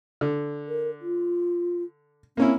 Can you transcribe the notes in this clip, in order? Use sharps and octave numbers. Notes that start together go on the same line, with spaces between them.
D3
A#4
F4
A#3 C4 C#4 E4